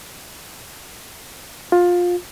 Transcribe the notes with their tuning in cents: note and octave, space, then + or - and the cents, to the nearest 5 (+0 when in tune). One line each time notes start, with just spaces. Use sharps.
F4 +20